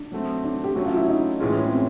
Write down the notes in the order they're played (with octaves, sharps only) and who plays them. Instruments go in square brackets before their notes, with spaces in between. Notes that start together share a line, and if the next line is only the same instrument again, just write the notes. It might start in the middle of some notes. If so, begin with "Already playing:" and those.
Already playing: [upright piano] D4
[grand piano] F#3 A3 C4
[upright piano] D4
G4
[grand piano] F#3 A3 C#4 [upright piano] F#4
[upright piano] F4
E4
D#4
[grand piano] A2 E3 G#3 C#4 F4
[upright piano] C4
B3